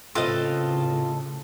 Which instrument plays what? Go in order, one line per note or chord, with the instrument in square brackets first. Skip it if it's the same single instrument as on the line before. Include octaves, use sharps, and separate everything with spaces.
[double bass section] A2 C#3 [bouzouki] C4 F4 [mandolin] A4 B4 D#5